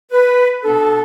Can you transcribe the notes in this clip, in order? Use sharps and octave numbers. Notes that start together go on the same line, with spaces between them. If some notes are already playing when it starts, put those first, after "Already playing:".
B4
B2 B3 D4 A4